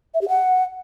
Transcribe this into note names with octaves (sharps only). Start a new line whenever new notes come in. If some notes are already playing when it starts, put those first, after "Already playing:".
E5
G4
F#5